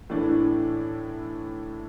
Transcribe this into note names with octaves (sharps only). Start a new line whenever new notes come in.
A2 E3 A3 D4